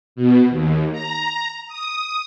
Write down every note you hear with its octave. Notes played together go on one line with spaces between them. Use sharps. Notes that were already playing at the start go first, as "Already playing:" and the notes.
B2
D#2
A#5
D#6